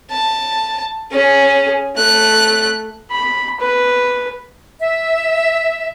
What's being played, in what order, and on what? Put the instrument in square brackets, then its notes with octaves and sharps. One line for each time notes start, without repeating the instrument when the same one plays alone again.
[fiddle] A5
C#4 G#4
A3 F#6
[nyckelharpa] B5
B4
[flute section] E5